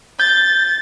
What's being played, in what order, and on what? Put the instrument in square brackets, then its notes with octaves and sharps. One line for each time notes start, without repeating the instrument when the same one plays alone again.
[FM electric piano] G6 [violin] A6